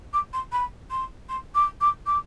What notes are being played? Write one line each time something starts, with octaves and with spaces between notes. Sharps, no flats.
D6
C6
B5
C6
C6
D6
D6
D6